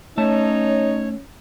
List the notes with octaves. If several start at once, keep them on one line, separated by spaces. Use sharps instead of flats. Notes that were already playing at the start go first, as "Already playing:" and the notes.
A3 C#4 D#4 C#5 A5